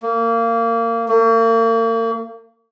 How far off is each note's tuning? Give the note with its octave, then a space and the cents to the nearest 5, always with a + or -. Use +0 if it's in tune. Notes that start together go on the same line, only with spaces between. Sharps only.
A#3 -25
A#3 -40